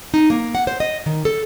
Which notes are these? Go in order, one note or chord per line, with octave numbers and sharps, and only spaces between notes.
D#4
A#3
F#5
C5
D#5
D#3
A4